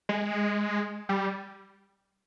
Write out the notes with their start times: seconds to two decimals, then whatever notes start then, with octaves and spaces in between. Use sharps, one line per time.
0.09 G#3
1.09 G3